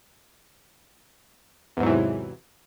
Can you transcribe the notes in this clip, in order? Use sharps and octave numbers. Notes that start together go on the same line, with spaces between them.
E2 G#2 C3 E3 F#3